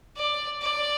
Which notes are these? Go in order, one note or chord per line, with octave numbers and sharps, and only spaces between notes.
D5
D5